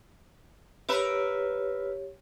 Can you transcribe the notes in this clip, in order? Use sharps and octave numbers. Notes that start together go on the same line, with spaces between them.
G4 A#4 B4 C#5 E5